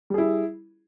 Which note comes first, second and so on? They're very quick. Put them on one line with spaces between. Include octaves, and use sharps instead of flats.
G3 G#4 E4